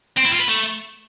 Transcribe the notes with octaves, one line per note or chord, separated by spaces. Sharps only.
C4
E4
F4
B4
A3